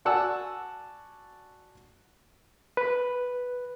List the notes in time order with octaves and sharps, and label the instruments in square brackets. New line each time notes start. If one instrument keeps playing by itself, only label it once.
[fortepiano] F#4 D5 F#5 G#5 A5 E6
[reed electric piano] B4